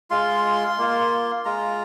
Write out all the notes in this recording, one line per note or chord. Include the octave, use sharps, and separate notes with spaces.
G#3 F4 C6
A#3 F4
G#3 F4 A#5